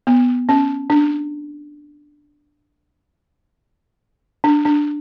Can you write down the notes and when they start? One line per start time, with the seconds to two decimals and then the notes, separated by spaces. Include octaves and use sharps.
0.07 B3
0.49 C#4
0.90 D4
4.44 D4
4.65 D4